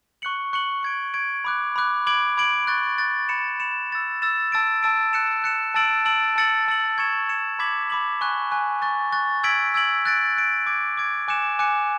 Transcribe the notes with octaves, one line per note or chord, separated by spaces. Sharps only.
C#6 F#6 C#7 F#7
C#6 F#6 C#7 F#7
C#6 G#6 D7
C#6 G#6 D7
B5 D6 F#6
B5 D6 F#6
B5 D6 G#6 D7 F#7
B5 D6 G#6 D7 F#7
C#6 F#6 A6
C#6 F#6 A6
B5 F#6 C#7 E7
B5 F#6 C#7 E7
E6 A6 E7
E6 A6 E7
A5 E6 A6 D7
A5 E6 A6 D7
F#6 C#7 E7
F#6 C#7 E7
A5 E6 A6 D7 F#7
A5 E6 A6 D7 F#7
A5 E6 A6 C#7 F#7
A5 E6 A6 C#7 F#7
C#6 G#6 C#7 E7
C#6 G#6 C#7 E7
B5 D6 G#6 B6 F#7
B5 D6 G#6 B6 F#7
G#5 C#6 F#6
G#5 C#6 F#6
C#6 F#6 A6
C#6 F#6 A6
E6 G#6 B6 D7 F#7
E6 G#6 B6 D7 F#7
F#6 A6 D7
F#6 A6 D7
D6 G#6 D7
D6 G#6 D7
G#5 D6 F#6 C#7 E7
G#5 D6 F#6 C#7 E7